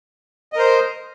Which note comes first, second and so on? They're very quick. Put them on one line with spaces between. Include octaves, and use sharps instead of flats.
D#5 A#4 C5